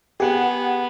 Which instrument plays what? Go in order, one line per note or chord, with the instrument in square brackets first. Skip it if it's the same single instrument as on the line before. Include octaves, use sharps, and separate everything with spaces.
[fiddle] B3 [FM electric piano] G4 [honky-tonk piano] G#4 F#5